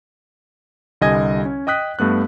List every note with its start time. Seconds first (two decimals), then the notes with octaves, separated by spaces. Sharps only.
1.01 C2 D3 G3 D#5 G#5 G#6
1.45 C#4
1.67 D#5 G5 D#6 F#6 B6
1.99 G2 A3 B3 F#6